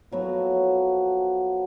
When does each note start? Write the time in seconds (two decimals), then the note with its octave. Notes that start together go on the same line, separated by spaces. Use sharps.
0.12 F3 F#3 B3 A4